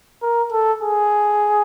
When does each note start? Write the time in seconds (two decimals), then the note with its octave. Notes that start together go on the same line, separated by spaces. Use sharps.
0.22 A#4
0.52 A4
0.82 G#4